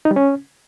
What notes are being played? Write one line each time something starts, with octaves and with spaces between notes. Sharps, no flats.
D#4
G3
C#4